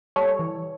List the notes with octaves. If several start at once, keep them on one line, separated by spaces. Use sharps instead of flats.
G3 A4 C#5
E3